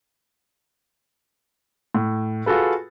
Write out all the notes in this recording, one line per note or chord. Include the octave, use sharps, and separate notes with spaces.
A2
F4 F#4 G#4 A4 B4